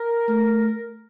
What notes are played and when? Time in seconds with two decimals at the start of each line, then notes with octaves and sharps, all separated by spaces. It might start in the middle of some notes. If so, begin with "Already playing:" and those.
Already playing: A#4
0.28 A3